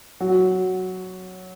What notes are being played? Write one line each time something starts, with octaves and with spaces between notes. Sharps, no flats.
F#3